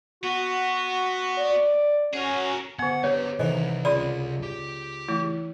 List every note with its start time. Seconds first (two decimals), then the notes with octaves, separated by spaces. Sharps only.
0.23 B3 F#4
1.38 D5
2.14 C#4 F#4 G#4 A#4
2.79 D3 B3 F#5
3.04 B3 G4 B4 C#5
3.40 C2 D#3 E3 A4 C5 D#5
3.85 C#2 D5 B5 C6 D#6
4.43 G4
5.08 E3 A3 E4